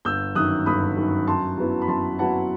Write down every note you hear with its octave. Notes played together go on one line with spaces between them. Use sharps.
G1 E6 G6
F#2 D#3 D#6 F#6
G1 B5 D#6
F#2 D#3
F#2 A5 C6
F#3 B3 E4
B5
F#2 A5 C6
F#3 B3 E4 F#5 A5